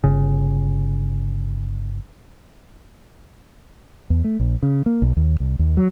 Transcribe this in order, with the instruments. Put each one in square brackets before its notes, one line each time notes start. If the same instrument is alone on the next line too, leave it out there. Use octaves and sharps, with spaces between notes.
[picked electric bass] G1 C#3
[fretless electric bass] E2
A3
A#1
C#3
A#3
B1
D#2
C2
D#2
F#3